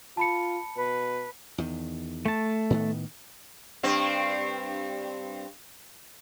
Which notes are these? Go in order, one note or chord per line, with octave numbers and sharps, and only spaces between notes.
F4 A5 B5 C#7
B2 B4
E2 D#3
A3 A5
A2 D#3 B3
G2 C4